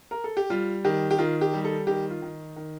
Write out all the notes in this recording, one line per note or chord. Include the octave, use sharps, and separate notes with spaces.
A#4
A4
G4
G3 F4
D#3 G4
G4
D#3 F4
G4
G3
A4
D#3 G4
F4
D#3
D#3